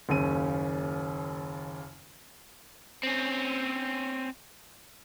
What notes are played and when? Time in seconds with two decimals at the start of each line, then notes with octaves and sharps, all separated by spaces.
0.09 F#1 D#2 C#3 C#4 D#7
3.04 C4 C#4